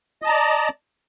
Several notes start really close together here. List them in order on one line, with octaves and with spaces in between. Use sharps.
D#5 A5 A#5 D5